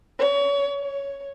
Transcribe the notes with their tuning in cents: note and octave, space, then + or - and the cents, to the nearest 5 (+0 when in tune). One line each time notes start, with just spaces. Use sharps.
C#5 +30
C#5 +5